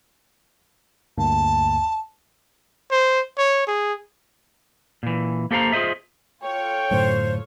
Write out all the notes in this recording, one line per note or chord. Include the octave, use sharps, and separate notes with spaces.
D2 G2 A#3 A5
C5
C#5
G#4
A#2 E3
A#3 G4 A4 C5 F5 A#5
F4 G#4 C5 D#5 E5
F4 A4 C#5 G5
F#2 A2 D3 C5